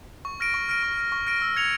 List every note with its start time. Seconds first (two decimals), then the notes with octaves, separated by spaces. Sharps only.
0.25 C#6
0.40 F6 A#6 D7
0.54 C#6
0.69 F6 A#6 D7
0.83 C#6
0.97 F6 A#6 D7
1.12 C#6
1.27 F6 A#6 D7
1.42 E6
1.56 G#6 C#7 F7